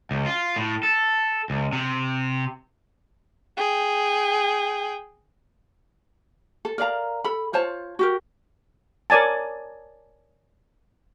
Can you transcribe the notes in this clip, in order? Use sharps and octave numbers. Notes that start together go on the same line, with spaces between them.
C#2
F4
A2
A4
C#2
C3
G#4 G5
A4
A#4 D5 F5 A#5
A4 B5
F4 C5 C#5 A5
F#4 G4 A#4
A#4 C#5 D5 G#5 A5